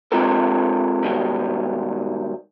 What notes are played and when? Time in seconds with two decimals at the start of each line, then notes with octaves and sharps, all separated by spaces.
0.12 G#3 C4 F4 G4 A4 A#4
1.03 G#2 B2 D#3 G3